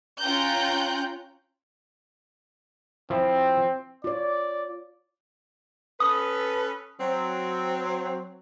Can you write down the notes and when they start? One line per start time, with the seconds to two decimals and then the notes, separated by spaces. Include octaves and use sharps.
0.21 C#4 F4 G5 A#5 F#6 G6
3.10 F3 C4 E4
4.04 F4 C#5 D5
6.00 C#4 A4 B4 D#6
7.00 F#3 C4